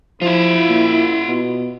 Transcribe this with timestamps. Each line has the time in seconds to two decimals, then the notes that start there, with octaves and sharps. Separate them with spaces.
0.22 F3 E4 F4 E5
0.69 A#2
1.28 B2